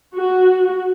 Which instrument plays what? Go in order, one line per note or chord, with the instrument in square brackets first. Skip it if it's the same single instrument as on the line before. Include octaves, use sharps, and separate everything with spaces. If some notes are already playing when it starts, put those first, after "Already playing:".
[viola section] F#4